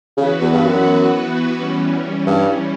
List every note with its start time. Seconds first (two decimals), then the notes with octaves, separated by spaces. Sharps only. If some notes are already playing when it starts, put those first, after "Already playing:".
0.17 C#3 E3 B3 F#4 B4
0.41 E2
0.53 G2
0.64 F#2
1.56 E3 G3 C#4
2.26 G2